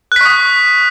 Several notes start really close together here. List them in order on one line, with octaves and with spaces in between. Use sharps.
F#6 B6 C#6 D#6